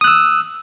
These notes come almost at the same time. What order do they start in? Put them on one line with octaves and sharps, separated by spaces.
D#6 F#6 E6